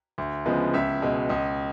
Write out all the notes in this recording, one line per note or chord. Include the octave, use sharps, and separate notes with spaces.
D2
C#3 F3 G#3 B3
C#2 E5
B2 G#3
C#2 D#5